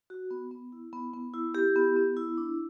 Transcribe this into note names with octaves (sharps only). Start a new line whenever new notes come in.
F#4
B3
B3
E4
B3
B3
E4
E4 G4
B3
B3
E4
D4